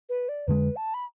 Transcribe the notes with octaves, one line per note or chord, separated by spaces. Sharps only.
B4
D5
F2 D3 G#3 B4
A5
B5